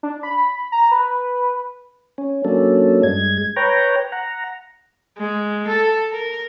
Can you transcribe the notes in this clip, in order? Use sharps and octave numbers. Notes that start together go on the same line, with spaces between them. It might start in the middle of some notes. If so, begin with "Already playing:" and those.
D4
B5
A#5
B4
C#4
F#3 A#3 C#4 D4 A4
G2 G#3 G#6
B4 C#5 G5 A#5
F#5 A#5
G#3
A4
A#4